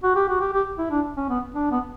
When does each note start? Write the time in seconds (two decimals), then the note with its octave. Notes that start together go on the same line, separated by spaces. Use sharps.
0.03 F#4
0.16 G4
0.28 F#4
0.41 G4
0.53 G4
0.78 E4
0.91 D4
1.17 C#4
1.29 B3
1.54 D4
1.71 B3